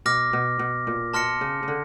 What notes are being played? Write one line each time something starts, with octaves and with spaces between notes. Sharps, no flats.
B2 D6 F6 A#6
B2
B2
A#2
B2 A5 C6 F6 A#6 C#7
C#3
C#3
D3